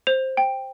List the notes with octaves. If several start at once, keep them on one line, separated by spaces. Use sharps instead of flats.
C5 F7
G5